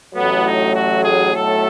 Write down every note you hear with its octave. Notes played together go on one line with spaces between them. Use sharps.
A1 A2 F#3 A3 B3
D#4
F#4
G#4
B1 A2 F#3 A3 A4